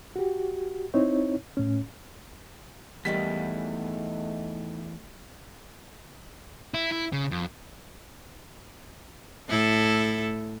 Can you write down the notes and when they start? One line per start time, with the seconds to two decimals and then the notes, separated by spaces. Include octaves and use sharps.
0.16 F#4 G4
0.94 C4 D#4 E4 C#5
1.57 A2 C#4
3.05 E2 G#2 D#3 G3 A3 F#4 B6
6.74 E4
6.92 E4
7.13 C#3
7.31 F2
9.48 A2 E4 A4